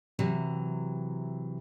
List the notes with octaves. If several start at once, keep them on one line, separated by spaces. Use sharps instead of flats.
C3 E3 F#3